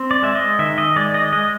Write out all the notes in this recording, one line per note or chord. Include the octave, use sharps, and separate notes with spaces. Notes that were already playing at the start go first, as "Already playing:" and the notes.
Already playing: C4
D5
G#3 E5
D#5
D#3 E5
D#5
G#3 D5
D#5
G#3 D#5